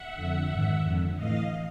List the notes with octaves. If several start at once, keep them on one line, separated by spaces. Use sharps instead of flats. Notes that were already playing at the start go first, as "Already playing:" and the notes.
Already playing: E5 F#5
F2 D3
G#2 D#3
F2 D3
A2 E3 D#5 F5